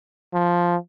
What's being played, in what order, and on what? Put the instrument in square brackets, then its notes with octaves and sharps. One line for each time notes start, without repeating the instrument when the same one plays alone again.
[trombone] F3